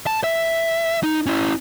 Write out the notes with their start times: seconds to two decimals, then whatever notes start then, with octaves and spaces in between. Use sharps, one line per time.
0.06 A5
0.24 E5
1.03 D#4
1.26 C#4 E4